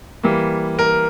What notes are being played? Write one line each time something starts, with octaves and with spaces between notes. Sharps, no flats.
E3 G3 A#3
A#4